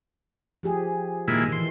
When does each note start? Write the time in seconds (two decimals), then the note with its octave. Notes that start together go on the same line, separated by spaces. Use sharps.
0.63 F3 G4 G#4
1.28 A#2 D#3 G#3 E4
1.52 E3 C6